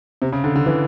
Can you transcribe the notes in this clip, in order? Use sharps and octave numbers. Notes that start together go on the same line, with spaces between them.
C3
C#3
D3
D3
E3